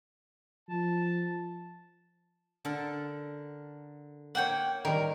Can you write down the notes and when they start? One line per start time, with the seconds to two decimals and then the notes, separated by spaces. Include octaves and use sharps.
0.69 F3 A5
2.65 D3 A4 A#4
4.35 A#3 C#5 F#5 G5
4.85 D#3 G3 A#4